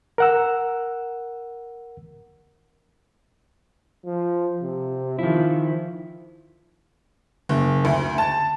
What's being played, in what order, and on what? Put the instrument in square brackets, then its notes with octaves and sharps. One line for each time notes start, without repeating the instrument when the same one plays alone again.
[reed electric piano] A#4 F#5 E6
[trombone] F3
C3
[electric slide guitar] D#3 E4 [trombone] F3
[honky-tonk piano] F#1
D2
A5